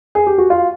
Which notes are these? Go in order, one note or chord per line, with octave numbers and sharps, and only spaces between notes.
G#4
G4
F#4
F4